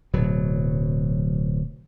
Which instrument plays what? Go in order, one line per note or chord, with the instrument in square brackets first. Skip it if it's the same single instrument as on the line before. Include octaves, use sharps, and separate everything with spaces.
[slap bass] D1 B2 F#3